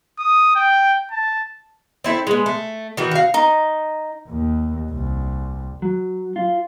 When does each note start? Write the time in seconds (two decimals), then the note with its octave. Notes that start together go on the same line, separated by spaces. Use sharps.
0.18 D#6
0.56 G5
1.11 A5
2.04 C4 E4 A4
2.27 G#3 B3
2.46 A3
2.97 D#3 E3 F#4
3.11 F#4 F5
3.34 D#4
4.28 D#2
4.91 C2
5.82 F#3
6.36 F4